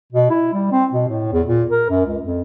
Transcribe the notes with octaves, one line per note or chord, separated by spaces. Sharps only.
B2
E4
G3
C4
B2
A2
E2
A#2
A#4
F#2
C#2
F2